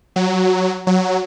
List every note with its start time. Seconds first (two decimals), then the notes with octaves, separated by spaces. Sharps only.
0.16 F#3
0.87 F#3